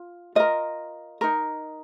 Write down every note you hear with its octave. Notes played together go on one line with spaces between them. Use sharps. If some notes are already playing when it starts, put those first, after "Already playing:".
Already playing: F4
F4 A#4 D#5
D#4 A#4